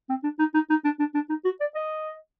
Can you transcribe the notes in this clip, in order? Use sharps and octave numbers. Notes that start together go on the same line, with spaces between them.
C4
D4
D#4
D#4
D#4
D4
D4
D4
D#4
F#4
D5
D#5